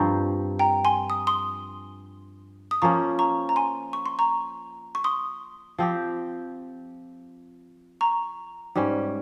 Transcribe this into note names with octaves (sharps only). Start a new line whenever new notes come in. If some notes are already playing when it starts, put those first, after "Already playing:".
Already playing: G2 F3 C4 A#5 C#6
G5 A#5
G#5 C6
D#6
C6 D#6
D#6
F3 A#3 C#4 A#5 C#6
A#5 C#6
A#5
G#5 C6
C#6
C6
A#5 C#6
C#6
C6 D#6
F3 C4 G4
A#5 C#6
G#2 G3 C#4